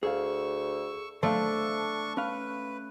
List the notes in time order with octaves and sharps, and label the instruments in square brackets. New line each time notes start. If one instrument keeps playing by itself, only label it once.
[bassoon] D2 [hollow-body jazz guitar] G#4 F5 [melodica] C#6 E6
[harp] A3 [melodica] D4 C#6 [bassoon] A4 [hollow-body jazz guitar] C5 D5 F5
[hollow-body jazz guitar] C#4 F5 [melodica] B4